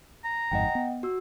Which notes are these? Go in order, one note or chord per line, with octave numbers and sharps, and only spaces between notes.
A#5
G1 F2 G#2 D#5 F#5 G5
B3
F#4 E6